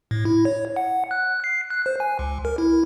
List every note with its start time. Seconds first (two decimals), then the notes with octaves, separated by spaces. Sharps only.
0.11 A2
0.25 E4
0.45 C#5
0.76 F#5
1.11 F#6
1.44 C7
1.70 F#6
1.86 C5
2.00 G#5
2.19 C#2
2.45 A#4
2.58 E4